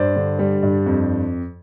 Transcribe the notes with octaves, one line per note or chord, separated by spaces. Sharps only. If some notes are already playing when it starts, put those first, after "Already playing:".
Already playing: G2 C5 D5
D3
G3
G2
F2